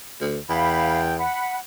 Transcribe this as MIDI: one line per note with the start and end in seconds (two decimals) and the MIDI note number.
0.21 0.38 38
0.49 1.26 40
0.49 1.01 77
0.49 1.13 79
0.49 1.01 83
1.18 1.58 78
1.18 1.55 83